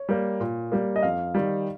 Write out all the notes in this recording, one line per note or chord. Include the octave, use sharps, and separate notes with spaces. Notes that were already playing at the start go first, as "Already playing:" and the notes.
Already playing: C#5
G3 A#3
A#2
G3 A#3
D#5
F2 F5
D#3 G3